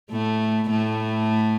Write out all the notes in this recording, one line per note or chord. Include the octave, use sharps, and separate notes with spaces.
A2 A3
A2 A3